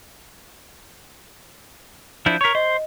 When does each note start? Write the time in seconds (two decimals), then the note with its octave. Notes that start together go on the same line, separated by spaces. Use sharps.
2.26 F3 D4 E4 G6
2.41 A#4 C#5 C#6 B6
2.55 C5 D#5